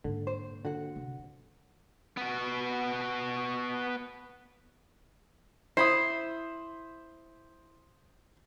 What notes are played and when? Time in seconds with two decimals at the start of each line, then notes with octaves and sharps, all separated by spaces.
0.04 G#2 D3 A#3
0.27 C5
0.65 D3 F#4 F#5
0.96 C3
1.19 E3
2.17 B3 F#4
5.77 E4 C5 B5 D#6 C7